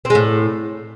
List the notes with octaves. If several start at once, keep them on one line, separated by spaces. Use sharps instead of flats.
C4
G#3
A2